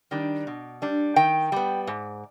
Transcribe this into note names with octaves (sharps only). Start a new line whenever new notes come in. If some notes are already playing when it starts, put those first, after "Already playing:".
D#3 G3 D4
B2
G3 D4
D#3 G5
G3 B3
G#2